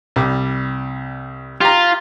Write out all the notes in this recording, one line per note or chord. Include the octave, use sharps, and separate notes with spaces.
C2 G3
F4 G4 A#5